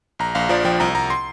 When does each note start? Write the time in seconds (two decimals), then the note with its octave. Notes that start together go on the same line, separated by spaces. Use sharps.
0.19 A#1 A#5
0.35 A#1 F5
0.49 F3 D5
0.65 F3 G5
0.80 C2 A#5
0.95 C2 A#5
1.10 C6